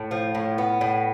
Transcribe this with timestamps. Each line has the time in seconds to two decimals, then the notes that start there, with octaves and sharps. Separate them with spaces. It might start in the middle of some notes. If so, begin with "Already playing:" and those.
Already playing: A2
0.11 F3
0.35 A2
0.58 B3
0.81 A2